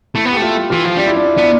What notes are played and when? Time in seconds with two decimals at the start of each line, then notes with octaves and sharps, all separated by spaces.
0.14 A3 E4
0.25 B3
0.31 G4
0.36 A3
0.42 F4
0.70 E3 F4
0.84 F3
0.97 G3 D4
1.07 E4
1.16 D4
1.25 E4
1.35 B3 D4
1.43 E4